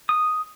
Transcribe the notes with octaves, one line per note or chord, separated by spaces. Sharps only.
D#6